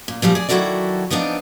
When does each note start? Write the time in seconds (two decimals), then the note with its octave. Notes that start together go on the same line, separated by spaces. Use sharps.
0.08 A#2
0.22 A#2 F3 G3 C4
0.35 G#4 D5
0.49 D#3 F#3 E4 F#4 A4 D5
1.10 F3 B3 C4 D4 D#4